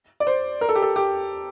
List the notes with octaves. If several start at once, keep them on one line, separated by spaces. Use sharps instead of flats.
D5
C5
A#4
A4
G4
A4
G4